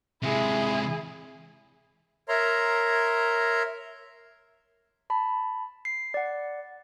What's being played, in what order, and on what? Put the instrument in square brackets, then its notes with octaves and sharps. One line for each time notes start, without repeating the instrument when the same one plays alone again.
[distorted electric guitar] C3 G#3 [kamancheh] E4 G#4
[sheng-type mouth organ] A#4 C#5 E5 A#5 C6
[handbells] A5 B5
C7
D5 F#5